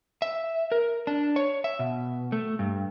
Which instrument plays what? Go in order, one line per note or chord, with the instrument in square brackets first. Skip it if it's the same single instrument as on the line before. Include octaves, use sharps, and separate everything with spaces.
[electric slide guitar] E5
A#4
D4
C#5
E5
B2
A3
G2